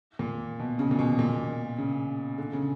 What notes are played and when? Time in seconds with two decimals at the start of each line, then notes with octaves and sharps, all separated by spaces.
0.19 A#2
0.59 B2
0.79 C#3
0.91 A#2
0.99 B2
1.19 A#2
1.78 C#3
2.38 D3
2.53 C#3